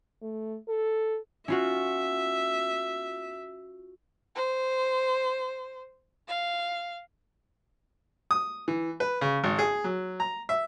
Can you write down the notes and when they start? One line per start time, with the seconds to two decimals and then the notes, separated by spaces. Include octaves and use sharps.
0.22 A3
0.68 A4
1.48 C#4 F4 F#4 E5
4.35 C5
6.28 F5
8.31 D#6
8.68 E3
9.00 B4
9.21 C#3
9.44 G#1
9.59 G#4
9.84 F#3
10.20 A#5
10.49 E5